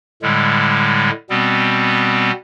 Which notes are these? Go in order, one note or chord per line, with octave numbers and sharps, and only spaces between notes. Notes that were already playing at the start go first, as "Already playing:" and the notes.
A2 D3 G3 G#3
B2 G3 B3 C4